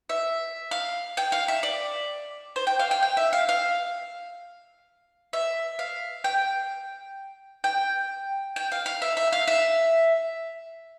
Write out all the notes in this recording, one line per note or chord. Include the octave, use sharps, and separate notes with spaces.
E5
F5
G5
F5
E5
D5
C5
G5
F5
G5
G5
E5
F5
F5
E5
F5
G5
G5
G5
F5
F5
E5
E5
F5
E5